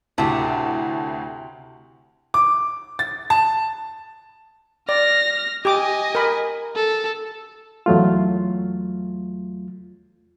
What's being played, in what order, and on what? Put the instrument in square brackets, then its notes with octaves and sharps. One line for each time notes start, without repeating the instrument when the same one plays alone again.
[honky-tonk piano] D2 A2 A5 [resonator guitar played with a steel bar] C3 F#4
[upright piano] D6
A6
A5
[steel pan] D5 [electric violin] F6 A#6
[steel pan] G4 D6 [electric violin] D#5 G#5
[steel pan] A#4 B5
[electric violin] A4
[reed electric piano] E2 F#3 A3 F4